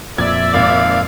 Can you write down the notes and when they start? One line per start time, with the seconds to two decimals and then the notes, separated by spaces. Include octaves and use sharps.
0.18 F2 A#2 D5 E5 G#6
0.54 G#1 F5